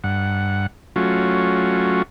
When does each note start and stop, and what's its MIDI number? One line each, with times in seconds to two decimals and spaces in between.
0.04 0.67 43
0.04 0.67 78
0.96 2.02 54
0.96 2.02 57
0.96 2.02 61
0.96 2.02 65
0.96 2.02 66